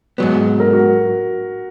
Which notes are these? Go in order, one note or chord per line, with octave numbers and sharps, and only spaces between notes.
G#2 F#3 B3
A#4
F#4